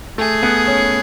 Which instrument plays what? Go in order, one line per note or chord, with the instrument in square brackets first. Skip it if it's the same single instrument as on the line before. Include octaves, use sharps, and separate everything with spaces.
[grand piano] A3 [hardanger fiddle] G#4
[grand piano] B3
C#4